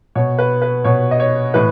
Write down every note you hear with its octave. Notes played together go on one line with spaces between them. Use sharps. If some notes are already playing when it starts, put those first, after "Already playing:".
B2 C#5
B4
B4
B2 C#5
D#5
C#5
A2 E3 B4